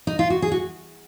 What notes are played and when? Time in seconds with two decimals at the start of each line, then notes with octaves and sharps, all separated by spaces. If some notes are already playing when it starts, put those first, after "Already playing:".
0.07 D#4
0.19 F4
0.30 F#4
0.42 G#4
0.52 F#4